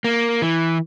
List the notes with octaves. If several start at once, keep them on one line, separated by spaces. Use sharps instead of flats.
A#3
E3